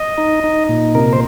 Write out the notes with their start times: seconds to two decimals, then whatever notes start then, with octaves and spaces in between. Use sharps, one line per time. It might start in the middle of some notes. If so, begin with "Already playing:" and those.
Already playing: D#5
0.18 D#4
0.44 D#4
0.69 A#2
0.95 C3 A#4
1.13 C5